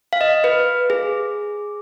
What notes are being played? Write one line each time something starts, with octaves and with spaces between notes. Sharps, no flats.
F5
D#5
B4
G#4